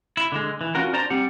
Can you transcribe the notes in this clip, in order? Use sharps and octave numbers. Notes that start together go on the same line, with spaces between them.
E4
D3 G#3
E3
C#4 F4 F#4 A#4
D4 C5 D5 A5 A#5
G3 C4 G4 F#5